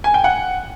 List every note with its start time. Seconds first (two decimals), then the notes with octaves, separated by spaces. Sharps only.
0.04 G#5
0.14 G5
0.24 F#5